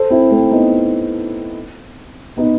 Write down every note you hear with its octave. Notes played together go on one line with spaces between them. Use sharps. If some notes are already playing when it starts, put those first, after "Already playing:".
Already playing: A4 C5
C4 E4
A3 C4
B3 D#4
B3 D#4